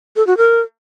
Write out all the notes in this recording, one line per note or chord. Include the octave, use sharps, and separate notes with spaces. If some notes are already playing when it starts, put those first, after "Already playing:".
A4
F#4
A#4